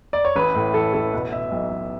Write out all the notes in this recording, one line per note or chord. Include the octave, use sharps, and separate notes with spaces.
D5
C#5
A1 B4
A2
E3 A4
A1 A4
B2 B4
B2 E5
B1
B1